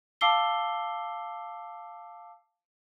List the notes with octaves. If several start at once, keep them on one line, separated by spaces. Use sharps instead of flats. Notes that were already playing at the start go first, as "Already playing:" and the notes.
F5 A5 D6 E6 C7 G7